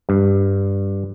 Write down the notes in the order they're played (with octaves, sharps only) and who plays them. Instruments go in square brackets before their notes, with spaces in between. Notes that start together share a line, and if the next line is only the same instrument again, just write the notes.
[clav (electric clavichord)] G2